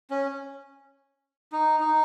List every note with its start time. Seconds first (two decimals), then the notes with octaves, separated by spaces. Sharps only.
0.10 C#4
1.52 D#4
1.80 D#4